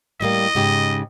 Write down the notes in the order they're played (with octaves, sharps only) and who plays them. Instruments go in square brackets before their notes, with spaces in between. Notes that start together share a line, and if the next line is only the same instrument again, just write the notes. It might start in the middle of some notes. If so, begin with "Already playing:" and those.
[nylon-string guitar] A2 G3 A#3 [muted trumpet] D#5
[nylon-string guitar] G#2 C#3 G4